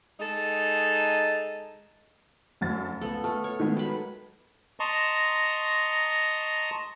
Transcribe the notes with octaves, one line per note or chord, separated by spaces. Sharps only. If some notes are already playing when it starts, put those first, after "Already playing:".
G#3 D#4 A4 D#5
F1 F#2 A6
C#2 B3 A4
A3 F6
C#5
D#3 G#3 B3
F#3 B5
D#5 A5 A#5 C6 C#6